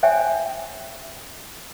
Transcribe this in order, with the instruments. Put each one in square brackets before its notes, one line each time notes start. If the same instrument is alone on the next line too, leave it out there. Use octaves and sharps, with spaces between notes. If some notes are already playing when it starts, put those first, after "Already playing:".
[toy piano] C5 C#5 E5 G5 G#5